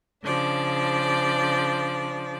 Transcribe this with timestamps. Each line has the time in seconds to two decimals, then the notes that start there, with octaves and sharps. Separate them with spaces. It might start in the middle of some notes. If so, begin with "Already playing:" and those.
0.24 C#3 F3 D4 D5